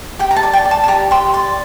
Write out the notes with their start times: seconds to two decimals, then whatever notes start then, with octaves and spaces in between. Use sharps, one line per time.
0.19 G4 G5
0.31 A#5
0.36 A5
0.43 D5
0.53 G5
0.65 D5
0.71 A5
0.84 A5
0.88 G4 A#5
1.11 G4 C6
1.34 D5 C6